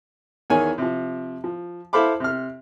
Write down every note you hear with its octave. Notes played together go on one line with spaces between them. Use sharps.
E2 D#3 C#5 G#5
C3 F3
F3
E4 A4 C5 F5 B5 D6
C3 F6